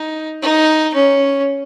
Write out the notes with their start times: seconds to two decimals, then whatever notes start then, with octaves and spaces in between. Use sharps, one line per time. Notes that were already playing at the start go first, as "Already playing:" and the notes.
Already playing: D#4
0.42 D#4
0.94 C#4